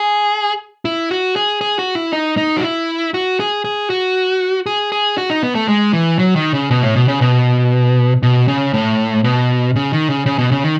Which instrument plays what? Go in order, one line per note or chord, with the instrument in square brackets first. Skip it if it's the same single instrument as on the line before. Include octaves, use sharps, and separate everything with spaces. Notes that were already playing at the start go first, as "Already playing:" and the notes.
Already playing: [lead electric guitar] G#4
E4
F#4
G#4
G#4
F#4
E4
D#4
D#4
F#4
E4
F#4
G#4
G#4
F#4
G#4
G#4
F#4
D#4
B3
A3
G#3
E3
F#3
D#3
C#3
B2
A2
B2
C#3
B2
B2
C#3
A2
B2
C#3
D#3
C#3
C#3
B2
C#3
D#3